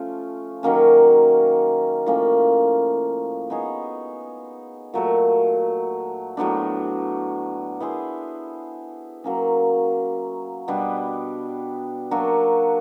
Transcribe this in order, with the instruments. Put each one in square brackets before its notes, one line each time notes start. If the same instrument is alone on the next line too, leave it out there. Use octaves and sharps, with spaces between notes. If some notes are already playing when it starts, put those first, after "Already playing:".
Already playing: [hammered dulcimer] F3 A3 C#4 F4
D#3 F#3 A#3 C#4
A2 F3 A#3 C#4
B3 D#4 G#4 C#5
A#2 F#3 A3
A2 F#3 B3 D4
B3 E4 G#4 C5
F#3 A#3 C#4
B2 G3 B3 D4
F#3 A#3 D4 F#4